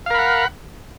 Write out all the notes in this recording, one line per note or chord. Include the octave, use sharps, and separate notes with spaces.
A#4 F5 F#5 B5